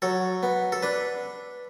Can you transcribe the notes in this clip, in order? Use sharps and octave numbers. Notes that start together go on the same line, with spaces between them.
F#3 A4
B3
A4
D4 B4